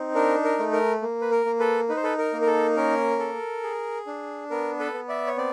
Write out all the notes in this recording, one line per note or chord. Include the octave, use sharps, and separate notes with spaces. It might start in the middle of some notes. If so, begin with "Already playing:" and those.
Already playing: C4 D#4
D4 A#4
A#4
A3
A#4
A#3
B4
A#4
A#3
A4 B4
D#4 B4
C5
A4 B4
A#4
A#3
A#4
A4
C#4 A#4
A4
G#4
D4
B3 A#4
A4 B4
B3
D5 E5
C#5
C4 D5